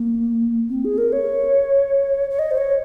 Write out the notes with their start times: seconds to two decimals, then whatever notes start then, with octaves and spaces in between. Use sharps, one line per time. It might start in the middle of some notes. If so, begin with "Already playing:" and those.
Already playing: A#3
0.70 C4
0.85 G#4
0.98 A#4
1.12 C#5
2.30 C#5
2.39 D#5
2.51 C5
2.58 C#5